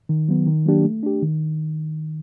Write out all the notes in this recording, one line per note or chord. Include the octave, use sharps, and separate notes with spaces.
D#3
F#3 B3
D#3
F#3 A#3 D4 G4
A3
D4 G4
D#3